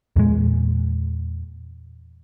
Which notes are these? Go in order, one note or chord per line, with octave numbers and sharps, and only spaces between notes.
E2 A#2 G#3